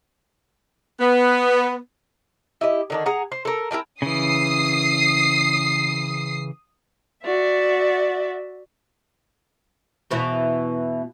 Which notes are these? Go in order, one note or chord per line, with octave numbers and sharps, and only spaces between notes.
B3
E4 G4 D#5
D3 D#3 D4
G#4 F#5 A#5
C5
A4 A#4
E4 A#4 G5 A5
C#3 E3 D#6 C7
F#4 D5 E5
E2 B2 E3